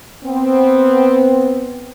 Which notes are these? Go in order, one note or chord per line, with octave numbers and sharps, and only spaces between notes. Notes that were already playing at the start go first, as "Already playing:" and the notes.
B3 C4